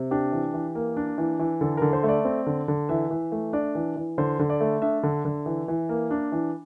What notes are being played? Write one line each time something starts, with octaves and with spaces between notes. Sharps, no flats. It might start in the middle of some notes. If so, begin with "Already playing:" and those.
Already playing: C3
D4 G4
E3
E3
A#3
D4
E3
E3
D3 A4
D3 A#4
C5
A3
D5
C4
D3
D3
E3 E5
E3
A3
D4 D5
E3
E3
D3 C5
D3
D5
A3
D4 E5
D3
D3
E3
E3
A#3
D4
E3